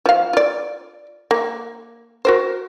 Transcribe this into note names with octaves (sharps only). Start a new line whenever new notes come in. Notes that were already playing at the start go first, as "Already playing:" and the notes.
F3 F5
F4 D5
A#3
F#4 A#4 C5